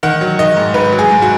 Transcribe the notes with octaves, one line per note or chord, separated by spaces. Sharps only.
D#3 F#5
F#3
D#3 D#5
G#2
G#2 B4
F#3
G#4
G#2
F#4